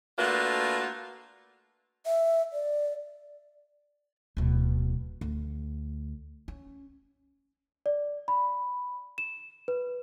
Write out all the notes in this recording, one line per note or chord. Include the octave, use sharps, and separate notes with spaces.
A3 A#3 D4 F4 F#4 B4
E5
D5
D1 B2
D2
C#4
D5
B5
E7
B4